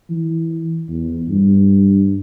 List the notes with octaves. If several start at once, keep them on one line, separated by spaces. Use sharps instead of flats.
E3
E2
G2